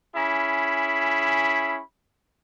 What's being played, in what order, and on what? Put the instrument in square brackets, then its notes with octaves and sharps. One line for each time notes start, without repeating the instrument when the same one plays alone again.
[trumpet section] C#4 E4 G#4 B5